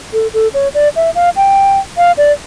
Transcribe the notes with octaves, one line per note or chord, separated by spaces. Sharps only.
A4
A4
C#5
D5
E5
F5
G5
F5
D5